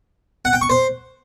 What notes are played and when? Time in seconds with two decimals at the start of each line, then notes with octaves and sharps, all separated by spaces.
0.45 F#5
0.53 G5
0.61 C#6
0.70 C5